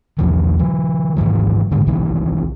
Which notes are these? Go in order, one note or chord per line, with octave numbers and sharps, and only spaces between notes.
B1 E2 D#3 F3
D#3 F3
G#2 D#3 E3 F#3
G#2 D3 D#3 G#3
C2 C3 D#3 E3